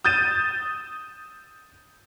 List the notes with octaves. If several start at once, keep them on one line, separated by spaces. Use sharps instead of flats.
D#6 G6 A6 D#7 E7